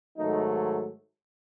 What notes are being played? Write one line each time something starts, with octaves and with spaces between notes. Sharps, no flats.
G#2 D#3 F#3 A3 D#4